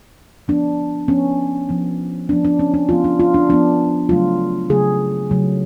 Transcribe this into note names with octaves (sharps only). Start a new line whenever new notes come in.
F3 B3 D4
F3 B3 C#4
F3 B3
F3 B3 D4
D4
C#4
D4
F3 B3 F4
D4
F4
D4
F3 B3 D4
C#3 F#3 A3 F4
C#3 F#3 A3 G#4
C#3 F#3 A3